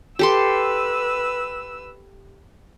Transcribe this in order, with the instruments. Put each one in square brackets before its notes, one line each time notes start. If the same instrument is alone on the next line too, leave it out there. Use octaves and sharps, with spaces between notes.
[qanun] G4 A4 C6 [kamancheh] B4 E6